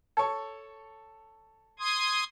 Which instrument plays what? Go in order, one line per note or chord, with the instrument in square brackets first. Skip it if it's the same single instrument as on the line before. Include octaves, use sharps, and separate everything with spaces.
[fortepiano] A4 C#5
[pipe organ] C6 D#6 G#6